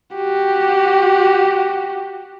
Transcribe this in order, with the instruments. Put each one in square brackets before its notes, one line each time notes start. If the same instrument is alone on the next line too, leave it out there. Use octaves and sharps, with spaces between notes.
[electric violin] F#4 G4